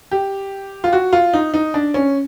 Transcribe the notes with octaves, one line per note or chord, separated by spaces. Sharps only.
G4
F4
F#4
F4
D#4
D#4
D4
C#4